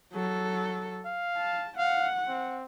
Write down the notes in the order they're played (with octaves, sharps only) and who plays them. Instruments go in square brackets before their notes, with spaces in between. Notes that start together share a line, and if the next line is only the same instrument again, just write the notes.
[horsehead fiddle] F#3 A4
[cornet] F5
[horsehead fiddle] A5
[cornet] F5 [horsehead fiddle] F#5
[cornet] C4